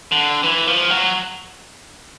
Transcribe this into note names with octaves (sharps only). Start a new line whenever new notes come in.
D3
E3
F3
F#3